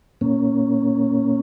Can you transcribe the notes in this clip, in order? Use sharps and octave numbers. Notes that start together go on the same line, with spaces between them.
A#2 A#3 C#4